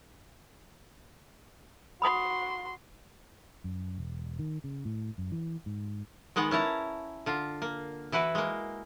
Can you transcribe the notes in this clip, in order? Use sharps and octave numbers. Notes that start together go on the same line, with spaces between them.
F#4 B5 C6 D#6
F#2
E1
D#3
C#3
A2
F#2
E3
G#2
D#3 G#3 B3 F#5
C#4 E4 A5 A#5
D3 F4
A#3
E3 E4 F#4 B4
G#3 A#3